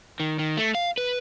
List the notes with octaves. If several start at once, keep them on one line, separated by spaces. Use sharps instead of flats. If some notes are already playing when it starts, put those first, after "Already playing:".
D#3
D#3
A3
F5
B4